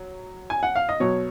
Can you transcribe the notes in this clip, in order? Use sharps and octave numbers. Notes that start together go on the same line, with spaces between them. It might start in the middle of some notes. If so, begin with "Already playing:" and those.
Already playing: F#3
G#5
F#5
F5
D#5
B2 F#3 C#5